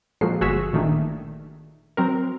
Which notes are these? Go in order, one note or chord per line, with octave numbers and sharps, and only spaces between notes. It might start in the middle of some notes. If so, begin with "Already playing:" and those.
A#2 F3 G#3 F#4 A4 C7
G1 F#4 G#4 C#6 E6 B6
A#2 D#3 A3 D4
F#3 C4 A#4